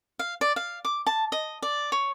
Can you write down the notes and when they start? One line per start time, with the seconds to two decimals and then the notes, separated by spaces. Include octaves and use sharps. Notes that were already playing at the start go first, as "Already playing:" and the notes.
0.19 F5
0.41 D5
0.56 F5
0.85 D6
1.07 A5
1.32 D#5
1.62 D5
1.92 C#5